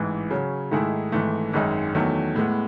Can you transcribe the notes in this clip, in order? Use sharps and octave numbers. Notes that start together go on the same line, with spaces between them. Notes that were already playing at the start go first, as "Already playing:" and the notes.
Already playing: A1 G#2 E3
C#3 F#3 C#4
G#2 D#3 A3 E4 G#4
G#1 G#2 E3 A3
G#1 F#2 D#3 G#3 D#4
E2 D#3 F#3 A3
A2 G#3 B3